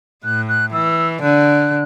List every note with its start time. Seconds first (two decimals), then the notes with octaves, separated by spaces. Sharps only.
0.24 A2 F#6
0.49 F#6
0.73 E3 E6
1.22 D3 F#6